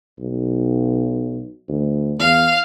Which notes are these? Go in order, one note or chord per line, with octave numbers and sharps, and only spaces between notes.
B1
D2
E2 F5